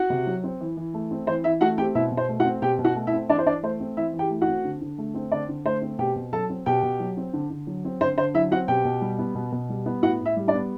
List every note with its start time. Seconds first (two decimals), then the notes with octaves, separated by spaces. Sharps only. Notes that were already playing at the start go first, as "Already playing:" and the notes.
Already playing: F#4 F#5
0.10 C3
0.26 F#3
0.44 C4
0.60 E3
0.77 E3
0.94 A3
1.11 C4
1.27 E3 C5
1.44 E3 E4 E5
1.61 A3 F#4 F#5
1.78 C4 G4 G5
1.95 B2 E4 E5
2.12 B2
2.17 C5
2.29 A3
2.40 F#4 F#5
2.45 C4
2.62 B2 G4 G5
2.79 B2
2.85 F#4 F#5
2.96 A3
3.07 E4 E5
3.13 C4
3.29 E3 D4 D5
3.38 C5
3.46 E3 D4 D5
3.63 A3 C5
3.80 C4
3.97 E3 E4 E5
4.13 E3
4.19 G4 G5
4.30 A3
4.41 F#4 F#5
4.48 C4
4.64 D3
4.81 D3
4.98 A3
5.14 C4
5.31 D3 D4 D5
5.48 D3
5.65 A3 C5
5.82 C4
5.99 B2 G4 G5
6.16 B2
6.33 F#3 A4 A5
6.50 C4
6.66 B2 G4 G5
6.83 B2
7.00 F#3
7.17 C4
7.33 D3
7.50 D3
7.67 F#3
7.85 C4
8.01 D3 C5
8.17 D3 C5
8.34 F#3 E4 E5
8.51 C4 F#4 F#5
8.68 B2 G4 G5
8.85 B2
9.01 G3
9.19 B3
9.35 B2
9.52 B2
9.69 G3
9.86 B3
10.03 A2 F#4 F#5
10.20 A2
10.25 E4 E5
10.36 G3
10.47 D4 D5
10.53 B3